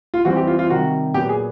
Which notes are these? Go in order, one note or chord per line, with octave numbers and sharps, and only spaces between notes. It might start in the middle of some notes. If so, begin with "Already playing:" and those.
F4
E3 G3 C4 F#4
G4
F4
F4
C3 D#3 G3 F#4
A#2 F#3 B3 G4
G#4